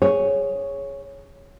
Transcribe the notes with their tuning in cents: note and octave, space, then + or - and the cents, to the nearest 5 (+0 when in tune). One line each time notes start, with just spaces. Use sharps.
G#4 -5 C#5 +0